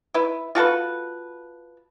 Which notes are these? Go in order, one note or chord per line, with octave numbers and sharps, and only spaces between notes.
E4 B4
F4 F#4 A4 B4